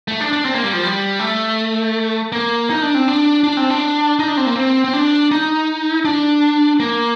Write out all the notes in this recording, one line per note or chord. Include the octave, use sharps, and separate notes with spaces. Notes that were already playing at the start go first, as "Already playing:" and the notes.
A3
D4
D4
C4
A#3
G3
F3
G3
A3
A#3
D#4
D4
C4
D4
D4
C4
D4
D#4
D4
C4
A#3
C4
C4
D4
D#4
D4
A#3